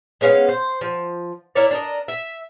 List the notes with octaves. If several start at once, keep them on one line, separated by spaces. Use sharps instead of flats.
G#3 B3 C#4 F5
C5
F3
E4 A#4 C#5 D5
D4 A#4 D#5
E5